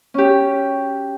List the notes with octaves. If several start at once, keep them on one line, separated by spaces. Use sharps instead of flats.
C#4 G4